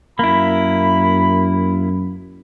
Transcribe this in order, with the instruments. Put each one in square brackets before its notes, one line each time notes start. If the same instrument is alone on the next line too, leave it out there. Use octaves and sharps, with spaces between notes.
[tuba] F#2 [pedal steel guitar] A#3 E4 [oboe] B5